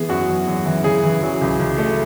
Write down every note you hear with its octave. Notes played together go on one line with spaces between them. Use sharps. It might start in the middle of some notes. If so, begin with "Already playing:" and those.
Already playing: E3 B3 G#4
F#2 F#4
E3
F#2
E3
C#3 G#4
E3
F#3
C#2
C#2
A3